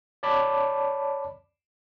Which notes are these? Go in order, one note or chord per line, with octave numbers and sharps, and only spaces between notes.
C#5 D5 A5 B5 D6